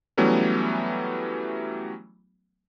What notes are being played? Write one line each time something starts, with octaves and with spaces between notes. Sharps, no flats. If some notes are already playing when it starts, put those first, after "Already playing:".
E3 F#3 G3 A3 B3 C#4